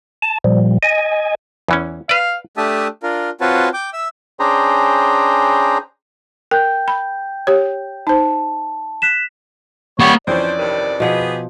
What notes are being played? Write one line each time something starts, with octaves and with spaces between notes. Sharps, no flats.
A5
A#2 F3 G3
D#5 G#5
E2 E3 C#4
B4 D5 F5
A3 D4 G4 E5 A5 D#6
D4 F4 A#4
C4 F4 F#4 B4 C#5 A5
G5 D6
E5 E6
C#4 D4 G#4 C5 G5 A#5
A#4 G5 G6
B5
G4 C#5
D#4 C5 A5
F#6 B6 E7
G3 A#3 C#5 F#5
F2 E3 C#4 D4 C5 D5
G2 C3 D#3
B2 F3 B3 G4 G#4 F#5